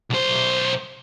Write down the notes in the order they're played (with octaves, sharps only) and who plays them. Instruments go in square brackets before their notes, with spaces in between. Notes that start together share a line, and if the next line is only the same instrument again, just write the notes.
[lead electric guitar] B1 C5